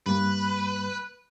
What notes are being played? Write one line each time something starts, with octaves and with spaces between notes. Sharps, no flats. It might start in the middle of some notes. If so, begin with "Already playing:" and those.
G2 G3 A#3 B4